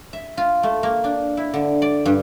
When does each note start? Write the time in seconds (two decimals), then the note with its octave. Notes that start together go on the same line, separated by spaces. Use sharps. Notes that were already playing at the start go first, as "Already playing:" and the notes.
0.13 E5
0.37 F4
0.63 A3
0.83 A#3
1.04 D4
1.37 E4
1.54 D3
1.82 D5
2.06 G2